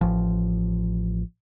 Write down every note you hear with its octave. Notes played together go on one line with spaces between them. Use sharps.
A1 F3